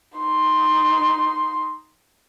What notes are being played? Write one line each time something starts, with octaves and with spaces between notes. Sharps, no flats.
D#4 C6